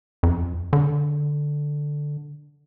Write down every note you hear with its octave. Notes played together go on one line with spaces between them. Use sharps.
F2
D3